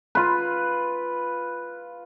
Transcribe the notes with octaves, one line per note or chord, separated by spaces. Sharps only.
F4 B4